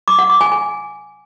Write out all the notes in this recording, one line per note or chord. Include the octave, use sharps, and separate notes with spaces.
D6
F#5
D6
G#5
G#5